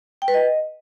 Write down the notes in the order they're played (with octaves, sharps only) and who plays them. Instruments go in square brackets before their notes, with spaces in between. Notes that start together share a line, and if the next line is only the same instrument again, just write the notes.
[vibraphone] G5
B4
D#5